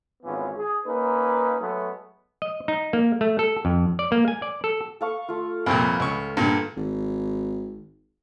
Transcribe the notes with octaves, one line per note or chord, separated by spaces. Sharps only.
G#1 E3 B3 C#4 F4
G#4
A#3 C#4 D#4 B4
F#3 G#3 A3 B3 F#4
D#5
D#4
A#3
A3
A4
F2
D5
A#3
G#5
D5
A4
A4 F5 C#6
A3 F4
C2 F2 A#2 B4
C#2 C#6
G2 A#2 D3
G#1